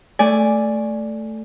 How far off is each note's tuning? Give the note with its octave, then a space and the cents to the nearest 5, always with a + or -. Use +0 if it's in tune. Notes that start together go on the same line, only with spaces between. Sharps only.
A3 +0 D5 +0 G#5 +0